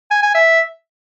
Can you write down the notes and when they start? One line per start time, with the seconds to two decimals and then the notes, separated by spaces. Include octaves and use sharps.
0.11 G#5
0.23 G#5
0.34 E5